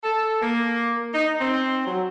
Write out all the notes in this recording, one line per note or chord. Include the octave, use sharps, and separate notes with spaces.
A4
A#3
D#4
C4
F#3